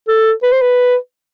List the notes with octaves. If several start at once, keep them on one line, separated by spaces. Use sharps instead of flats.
A4
B4
C5
B4